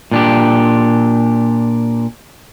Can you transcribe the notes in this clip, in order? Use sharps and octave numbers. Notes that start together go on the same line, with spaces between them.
A#2 D4 G4